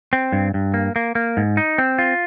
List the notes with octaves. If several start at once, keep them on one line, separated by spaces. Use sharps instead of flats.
C4
G2
G2
A#3
A#3
A#3
G#2
D#4
C4
F4